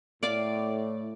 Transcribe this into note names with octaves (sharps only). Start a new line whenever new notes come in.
A2 D5 F5 D6